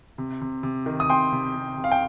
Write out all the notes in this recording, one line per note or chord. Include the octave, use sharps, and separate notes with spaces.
C3
C3
C3
D#3
D#6
C3 G5 C6
C3
C3
C3
F5
G5